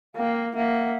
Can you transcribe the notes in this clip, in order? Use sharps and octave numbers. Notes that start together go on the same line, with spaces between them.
A#3 F5 G5
A#3 E5 F#5